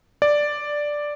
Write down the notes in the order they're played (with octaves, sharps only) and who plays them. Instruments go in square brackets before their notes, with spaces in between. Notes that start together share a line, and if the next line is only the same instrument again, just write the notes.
[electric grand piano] D5